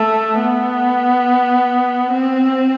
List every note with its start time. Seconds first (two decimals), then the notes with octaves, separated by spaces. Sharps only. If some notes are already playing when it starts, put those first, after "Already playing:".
Already playing: A3
0.40 B3
2.12 C4